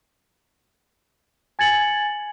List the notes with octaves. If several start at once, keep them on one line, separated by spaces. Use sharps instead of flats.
G#5 G#6 A6 C#7 F#7